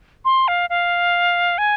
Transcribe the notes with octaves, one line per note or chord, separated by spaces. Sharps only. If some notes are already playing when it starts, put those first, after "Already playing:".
C6
F5
F5
G#5